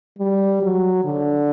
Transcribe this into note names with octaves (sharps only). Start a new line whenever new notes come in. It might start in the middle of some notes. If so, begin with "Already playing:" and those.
G3
F#3
D3